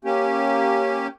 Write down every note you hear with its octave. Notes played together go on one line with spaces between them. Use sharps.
A#3 C#4 G4